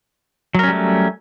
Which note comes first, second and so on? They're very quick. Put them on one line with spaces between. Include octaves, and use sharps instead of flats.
F#3 A#4 C#4 G3 A3